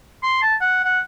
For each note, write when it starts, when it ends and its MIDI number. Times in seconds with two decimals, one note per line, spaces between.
0.23 0.39 84
0.42 0.55 81
0.61 0.83 78
0.84 1.00 78